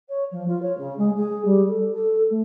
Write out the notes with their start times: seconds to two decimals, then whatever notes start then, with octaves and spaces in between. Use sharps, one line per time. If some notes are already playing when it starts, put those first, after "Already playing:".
0.08 C#5
0.31 F3
0.47 F4
0.62 C#5
0.77 C#3
0.97 G#3
1.17 G#4
1.44 G3
1.68 A4
1.92 A4
2.30 A3